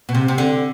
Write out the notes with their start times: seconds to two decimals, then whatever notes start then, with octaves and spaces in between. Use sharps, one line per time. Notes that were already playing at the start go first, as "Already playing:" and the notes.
0.09 B2
0.15 C3
0.28 C3
0.38 D3